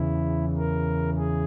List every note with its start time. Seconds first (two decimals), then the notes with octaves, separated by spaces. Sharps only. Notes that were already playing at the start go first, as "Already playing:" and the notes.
Already playing: E2 C#3 E3 E4
0.57 A#4
1.16 G#4